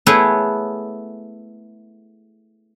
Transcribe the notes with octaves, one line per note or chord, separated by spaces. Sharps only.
A3 B3 E4 G#4 B4 C#5